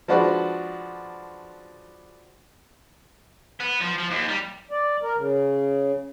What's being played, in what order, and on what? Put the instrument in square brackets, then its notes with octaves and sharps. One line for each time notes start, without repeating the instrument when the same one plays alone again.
[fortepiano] F3 G#3 D4 F#4 B4
[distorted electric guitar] B3
F3
F3
D#2
G3
[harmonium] D5
A#4
C#3